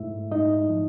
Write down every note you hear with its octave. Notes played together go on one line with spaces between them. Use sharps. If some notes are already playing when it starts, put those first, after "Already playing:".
Already playing: G#2 A3 E4 E5
G#2 D#4 D#5
F3